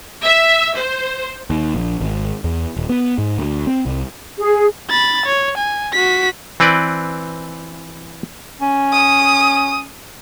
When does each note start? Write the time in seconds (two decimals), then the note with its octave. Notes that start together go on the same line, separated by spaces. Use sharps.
0.23 E5
0.75 C5
1.50 D#2
1.75 A#1
2.01 G#1
2.44 E2
2.77 D#1
2.89 B3
3.18 G#2
3.38 D2
3.67 C4
3.86 C2
4.38 G#4
4.90 B5 A6
5.26 C#5
5.57 G#5
5.93 F#4 B6
6.60 E3 C4 B4 D5
8.61 C#4
8.92 D#6